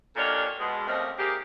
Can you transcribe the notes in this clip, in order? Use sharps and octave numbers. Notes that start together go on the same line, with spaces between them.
D#2 A#2 C#4 D4 A4 C#5
B2 G#3
D#2 A3 A#3 C4 C#4 D#5
G#3 A#3 D#4 G4